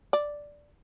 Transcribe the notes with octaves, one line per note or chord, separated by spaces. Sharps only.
D5